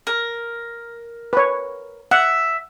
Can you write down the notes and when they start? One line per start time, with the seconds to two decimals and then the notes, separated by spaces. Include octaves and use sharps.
0.07 A#4
1.33 B4 C#5
2.11 E5 F#5